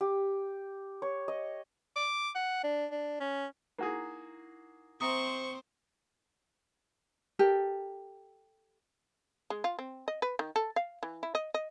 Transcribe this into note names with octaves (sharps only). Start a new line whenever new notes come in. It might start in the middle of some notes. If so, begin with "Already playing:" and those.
G4
C#5
D#5
D6
F#5
D4
D4
C#4
A#3 D#4 E4 F#4 G#4
C4 C5 E5 A#5 C#6 D#6
G4 A4 A#4
G#3
F4
C4
D#5
B4
D#3
A4
F5
E3
E4
D#5
D#5